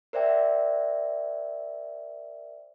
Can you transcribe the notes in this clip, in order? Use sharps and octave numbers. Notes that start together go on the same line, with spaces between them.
A#4 C5 D5 E5 G5